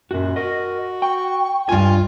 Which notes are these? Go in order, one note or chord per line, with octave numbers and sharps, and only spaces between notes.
F#2 A#2 F#4
F#4 A#4 D#5
G5 C#6
C#2 G2 F4 G#5